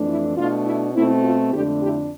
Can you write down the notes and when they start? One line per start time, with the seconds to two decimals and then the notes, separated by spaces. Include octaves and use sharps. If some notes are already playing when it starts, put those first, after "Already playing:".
Already playing: F2 E3 A3 D4
0.08 E4
0.37 B2 A3 D4 F4
0.66 E4
0.94 B2 A3 C4 E4
1.24 F4
1.52 F2 D3 A3 D4 E4 G4
1.81 E4 G4